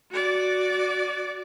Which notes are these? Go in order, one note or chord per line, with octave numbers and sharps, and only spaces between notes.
F#4 D5